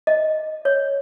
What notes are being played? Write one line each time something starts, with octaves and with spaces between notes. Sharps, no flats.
D#5
C#5